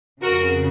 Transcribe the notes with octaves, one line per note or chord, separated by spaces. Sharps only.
F2 C#3 F#4 A#4